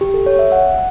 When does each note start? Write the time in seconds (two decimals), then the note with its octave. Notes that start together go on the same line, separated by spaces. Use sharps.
0.01 G4
0.14 A4
0.26 C#5
0.39 E5
0.52 F#5